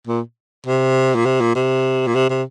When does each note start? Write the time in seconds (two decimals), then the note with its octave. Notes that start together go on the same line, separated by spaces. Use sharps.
0.07 A#2
0.66 C3
1.15 A#2
1.25 C3
1.41 A#2
1.55 C3
2.07 A#2
2.15 C3
2.29 C3